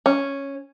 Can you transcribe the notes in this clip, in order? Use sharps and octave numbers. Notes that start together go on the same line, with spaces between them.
C#4